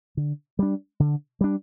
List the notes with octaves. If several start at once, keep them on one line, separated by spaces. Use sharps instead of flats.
D3
G3 D4
D3
G3 D4